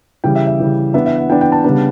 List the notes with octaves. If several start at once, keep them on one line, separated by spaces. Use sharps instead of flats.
C#3 E3 G3 G5
E5
E5
C#3 E3 G3
E3 B3 D4 E5
E5
F#5
E3 B3 D4 G5
G5
A5
C#3 G3 B3 D4